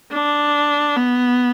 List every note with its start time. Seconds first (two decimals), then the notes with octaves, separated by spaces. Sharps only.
0.13 D4
0.97 B3